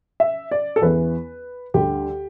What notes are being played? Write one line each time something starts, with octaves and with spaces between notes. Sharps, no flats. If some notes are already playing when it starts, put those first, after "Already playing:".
E5
D5
A4
E2 E3 B3 B4
D2 D3 G3 G4